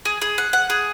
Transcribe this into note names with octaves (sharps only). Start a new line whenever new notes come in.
G#4
G#4
F#5
F#5
G#4